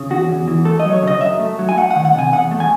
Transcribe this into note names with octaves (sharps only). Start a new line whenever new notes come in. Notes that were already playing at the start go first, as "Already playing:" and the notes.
Already playing: C#3
E2 F#4
E2
E3
A3 A4
D#5
F#3
C#5
C#3 D#5
F#2 E5
A3
F#3
G#5
A3 F#5
D#3 F#5
F#5
C3 G#5
E2 F#5
A3
G#5